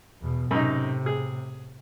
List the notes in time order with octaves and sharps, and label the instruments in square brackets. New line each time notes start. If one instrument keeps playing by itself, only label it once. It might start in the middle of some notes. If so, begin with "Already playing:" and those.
[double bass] E2 B2
[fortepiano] F#2 D#4 [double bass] A2 C3
[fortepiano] G#4